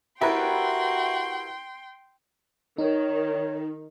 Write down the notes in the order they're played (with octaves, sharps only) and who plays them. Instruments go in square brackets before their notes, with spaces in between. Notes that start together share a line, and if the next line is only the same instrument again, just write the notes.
[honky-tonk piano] E4 B4 [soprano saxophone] F#4 [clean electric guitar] G4 A#4 [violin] G5 C6
[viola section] D#3 [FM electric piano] D#4 [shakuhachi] C#5